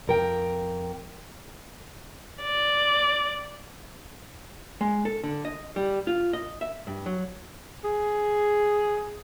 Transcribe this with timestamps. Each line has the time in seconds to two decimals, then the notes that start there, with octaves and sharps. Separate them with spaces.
0.07 F2 A#4 G5
2.43 D5
4.81 G#3
5.05 A4
5.24 D3
5.45 D#5
5.76 G3
6.07 F4
6.33 D#5
6.61 E5
6.87 G2
7.06 F#3
7.84 G#4